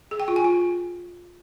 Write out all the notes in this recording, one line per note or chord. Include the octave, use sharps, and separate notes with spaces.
G#4
G5
F4
G#5
F4